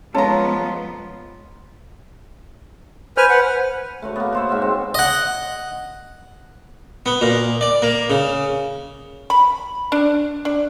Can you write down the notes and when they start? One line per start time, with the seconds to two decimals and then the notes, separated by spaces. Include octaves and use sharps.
0.15 F3 G#3 B3 C#4 F4 A4 A#5
3.17 B4 C5 G#5 F6
3.29 B4 F#5
4.02 A3 F#4 C#5
4.16 A#3 B3
4.33 F#4 C5 E5
4.49 G#2 B2 E5
4.62 C4
4.95 D#5 F#5
7.06 B3
7.21 A#2
7.61 D5
7.82 A#3
8.10 C#3
9.30 B5
9.92 D4
10.45 D4